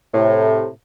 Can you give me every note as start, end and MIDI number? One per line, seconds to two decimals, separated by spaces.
0.14 0.68 45
0.14 0.68 48